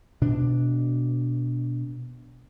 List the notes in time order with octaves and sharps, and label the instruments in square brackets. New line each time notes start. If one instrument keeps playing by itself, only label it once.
[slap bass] B2 D4